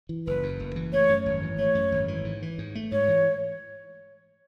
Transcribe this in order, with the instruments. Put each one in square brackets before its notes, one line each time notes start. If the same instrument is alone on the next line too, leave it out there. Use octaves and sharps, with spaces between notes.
[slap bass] E3
[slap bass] F#1 [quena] B4
[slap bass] F#2
F#1
E3
[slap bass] A3 [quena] C#5
[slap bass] F#2
G#1
E3
[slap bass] A3 [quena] C#5
[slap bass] F#2
G#1
E3
G#2
E3
G#2
A3
[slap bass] G#2 [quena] C#5
[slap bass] E3